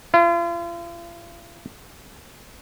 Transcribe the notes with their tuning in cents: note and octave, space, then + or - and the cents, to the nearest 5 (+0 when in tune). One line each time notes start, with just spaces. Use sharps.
F4 -40